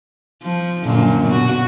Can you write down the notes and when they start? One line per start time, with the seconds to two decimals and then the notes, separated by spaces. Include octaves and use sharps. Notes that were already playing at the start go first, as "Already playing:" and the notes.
0.42 F3
0.84 F#2 A#2 D3
1.27 B2 F#4